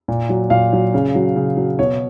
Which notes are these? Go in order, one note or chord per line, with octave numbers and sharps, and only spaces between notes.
A#2
F#3
A#2 F5
F#3
C#3
F#3
C#3
F#3
B2 C#5